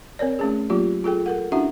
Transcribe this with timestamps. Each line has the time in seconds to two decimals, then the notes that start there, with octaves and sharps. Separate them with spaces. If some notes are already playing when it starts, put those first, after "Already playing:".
0.19 C4 A#4 C#5 D5
0.39 A3 C#4 G#4
0.70 F#3 A#3 F4 G4
1.04 F4 G#4 A4 G5
1.26 A4 A#4 F#5
1.52 C#4 D4 E4 F#4 E5 F#5